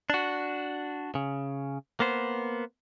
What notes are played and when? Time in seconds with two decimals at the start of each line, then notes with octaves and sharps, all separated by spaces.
0.10 D4 F#4
1.15 C#3
2.00 A#3 B3 C5